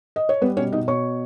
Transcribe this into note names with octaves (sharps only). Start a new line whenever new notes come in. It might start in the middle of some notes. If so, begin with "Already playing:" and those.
D#5
C#5
G3 B3 B4
B2 C#4 C#5
B2 D#4 D#5
B2 C#5 C#6